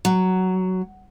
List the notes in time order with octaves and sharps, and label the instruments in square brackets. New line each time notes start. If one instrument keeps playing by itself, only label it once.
[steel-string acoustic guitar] F#3